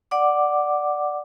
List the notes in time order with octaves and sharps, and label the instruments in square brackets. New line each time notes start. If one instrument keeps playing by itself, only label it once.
[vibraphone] D5 F#5 D6